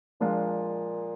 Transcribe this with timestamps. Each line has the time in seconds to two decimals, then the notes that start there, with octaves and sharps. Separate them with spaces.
0.21 A#2 F3 G#3 D4 F4